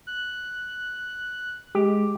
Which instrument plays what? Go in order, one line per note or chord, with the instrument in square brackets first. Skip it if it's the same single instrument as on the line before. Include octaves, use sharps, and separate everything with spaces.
[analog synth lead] F#6
[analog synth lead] G#3 [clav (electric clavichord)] G4